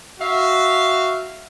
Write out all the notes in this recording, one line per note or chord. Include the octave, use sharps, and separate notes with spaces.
F#4 E5 F5